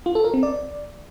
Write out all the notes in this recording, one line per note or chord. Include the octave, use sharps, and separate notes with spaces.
F4
A4
A#4
C4
D5